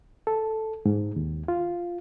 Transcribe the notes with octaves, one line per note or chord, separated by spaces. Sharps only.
A4
G#2
D#2
F4